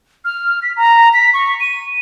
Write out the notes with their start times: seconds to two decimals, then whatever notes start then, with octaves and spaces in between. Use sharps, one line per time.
0.25 F6
0.63 B6
0.77 A#5
1.14 B6
1.34 C#6
1.60 D#7